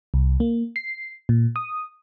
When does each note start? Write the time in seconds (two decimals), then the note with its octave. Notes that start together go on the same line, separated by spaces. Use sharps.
0.14 C2
0.40 A#3
0.76 C7
1.29 A#2
1.56 D#6